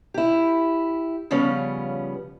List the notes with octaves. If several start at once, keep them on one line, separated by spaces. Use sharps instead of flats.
E4 G4
C#3 F3 G3 B3 C#4